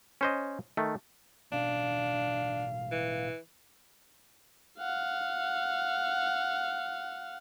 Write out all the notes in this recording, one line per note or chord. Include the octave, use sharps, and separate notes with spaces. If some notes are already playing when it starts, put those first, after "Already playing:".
C#4 C5 D#5
D#3 A3
A1 B2 C#4 D4 F5
E3
F5 F#5